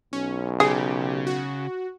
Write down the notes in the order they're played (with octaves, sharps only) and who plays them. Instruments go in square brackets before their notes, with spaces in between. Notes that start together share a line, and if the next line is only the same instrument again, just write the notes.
[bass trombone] B1 [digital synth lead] C#4
[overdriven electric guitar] C#3 [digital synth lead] G4 [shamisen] G#4
[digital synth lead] F#4